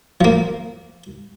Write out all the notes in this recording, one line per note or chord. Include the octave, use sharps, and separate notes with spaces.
F3 A#3